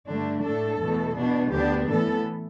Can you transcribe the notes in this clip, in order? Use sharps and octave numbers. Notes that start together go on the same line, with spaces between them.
G2 D3 A3 D4
A2 A3 D4 A4
E2 B2 A3
B2 B3 D4
D2 D3 B3 D4 G4
A2 E3 B3 A4